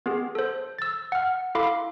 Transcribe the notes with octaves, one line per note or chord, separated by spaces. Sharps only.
B3 G4 G#4
A4 C5
E6 A6
F#5 F6
E4 A4 F5 B5 C6 D6